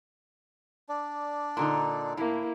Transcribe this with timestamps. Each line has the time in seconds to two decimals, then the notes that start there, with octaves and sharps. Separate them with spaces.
0.89 D4 D5
1.57 A#2 D3 D#4
2.17 A2 A#3 E4